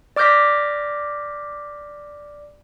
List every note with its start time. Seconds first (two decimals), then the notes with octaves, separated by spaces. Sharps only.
0.16 D5 D6 F6 G6 A#6 B6